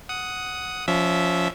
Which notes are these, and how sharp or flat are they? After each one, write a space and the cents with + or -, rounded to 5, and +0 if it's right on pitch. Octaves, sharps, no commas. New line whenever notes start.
F#5 +0 D#6 +10
F3 +10 C#4 +25 E5 -5